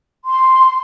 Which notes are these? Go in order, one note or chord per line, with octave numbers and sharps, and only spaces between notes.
C6